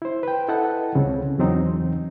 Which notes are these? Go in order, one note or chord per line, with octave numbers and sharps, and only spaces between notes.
E4 C5
B4 G5
E4 A4 D#5 F#5 A5
C#2 C#3 C4
E2 E3 F#3 C4 D#4